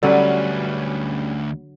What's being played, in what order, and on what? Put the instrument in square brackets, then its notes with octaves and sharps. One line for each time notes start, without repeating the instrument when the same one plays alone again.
[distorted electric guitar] D2 B4 [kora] D3 F#3 [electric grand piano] G3 C#4